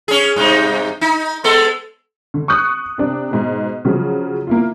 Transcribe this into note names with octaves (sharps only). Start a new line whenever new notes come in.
C#4 G#4
G2 C3 D#4
D#4
G#3 B3 A4
D3
C#6 D#6 F#6 C#7
C3 D4
G#2 B2
C#3 F3 F#3
A#3 E4 F4